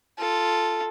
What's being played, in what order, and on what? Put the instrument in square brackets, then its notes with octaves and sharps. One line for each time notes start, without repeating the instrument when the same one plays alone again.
[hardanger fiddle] F4 A4